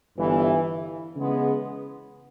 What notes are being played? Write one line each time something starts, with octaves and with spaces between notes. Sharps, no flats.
G1 G2 E3
C#3 E3 G#3 B3